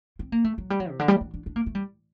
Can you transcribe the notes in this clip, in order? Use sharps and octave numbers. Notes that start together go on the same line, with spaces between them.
C4
A#3
A3
F#3
G3
F#3
C3
D3
G3
D4
D4
D4
A#3
A3
G3